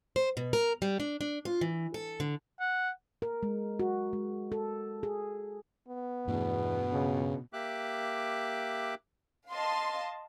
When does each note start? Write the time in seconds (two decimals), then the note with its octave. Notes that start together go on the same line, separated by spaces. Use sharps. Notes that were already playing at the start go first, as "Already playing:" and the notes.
0.16 C5
0.37 B2
0.53 A#4
0.82 G3
1.00 D4
1.21 D4
1.45 F4
1.61 E3
1.94 A4
2.20 D3
2.60 F#5
3.22 A#4
3.43 G#3
3.80 F#4
4.13 G#3
4.52 A4
5.03 G#4
5.89 B3
6.28 E2 G2 B2 A3 D4
6.92 C#3
7.53 A#3 G4 E5 D6 F#6
9.52 D#5 F5 A5 C6